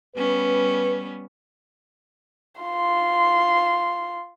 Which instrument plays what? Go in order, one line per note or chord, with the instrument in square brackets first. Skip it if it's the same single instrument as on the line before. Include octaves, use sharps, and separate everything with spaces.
[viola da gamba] G3 B3 C#4 [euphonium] B4
[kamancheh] F4 C6